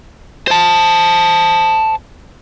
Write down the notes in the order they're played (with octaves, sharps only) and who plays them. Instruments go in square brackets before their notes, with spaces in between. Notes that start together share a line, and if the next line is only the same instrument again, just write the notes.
[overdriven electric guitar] C5 A5